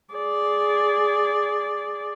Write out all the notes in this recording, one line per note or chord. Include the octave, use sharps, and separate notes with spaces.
G#4 D5